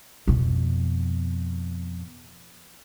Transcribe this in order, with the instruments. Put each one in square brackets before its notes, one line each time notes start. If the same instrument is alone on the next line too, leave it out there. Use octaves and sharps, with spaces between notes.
[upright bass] F2 B2